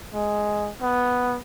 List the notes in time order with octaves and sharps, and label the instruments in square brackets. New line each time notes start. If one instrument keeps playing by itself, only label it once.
[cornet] G#3
B3